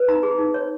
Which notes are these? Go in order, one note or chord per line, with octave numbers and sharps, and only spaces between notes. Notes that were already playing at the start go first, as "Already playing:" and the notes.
Already playing: B4
D#4 A#5
G#4
D#4
C#5